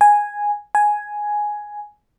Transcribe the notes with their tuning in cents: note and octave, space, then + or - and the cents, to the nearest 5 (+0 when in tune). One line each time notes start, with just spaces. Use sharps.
G#5 -5
G#5 +5